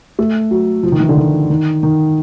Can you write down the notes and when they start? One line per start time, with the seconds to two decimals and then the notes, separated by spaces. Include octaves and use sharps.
0.19 A3
0.51 F#3
0.83 F3
0.92 D#3
1.00 E3
1.09 D3
1.17 D#3
1.50 D#3
1.83 D#3